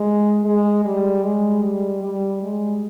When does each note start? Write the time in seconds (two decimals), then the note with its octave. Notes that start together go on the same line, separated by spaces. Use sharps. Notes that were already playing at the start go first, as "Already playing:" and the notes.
Already playing: G#3
0.44 G#3
0.85 G3
1.24 G#3
1.64 G3
2.04 G3
2.43 G#3